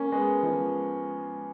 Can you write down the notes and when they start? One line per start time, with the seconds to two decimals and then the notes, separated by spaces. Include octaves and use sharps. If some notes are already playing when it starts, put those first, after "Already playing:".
Already playing: A#3 C#4
0.12 G#3 B3
0.43 F3 G#3